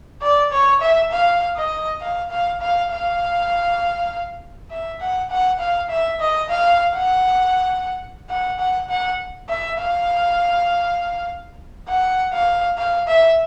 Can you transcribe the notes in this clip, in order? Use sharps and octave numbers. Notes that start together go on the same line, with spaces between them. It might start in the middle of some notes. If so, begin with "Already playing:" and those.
D5
C#5
E5
F5
D#5
F5
F5
F5
F5
E5
F#5
F#5
F5
E5
D#5
F5
F#5
F#5
F#5
F#5
E5
F5
F#5
F5
F5
E5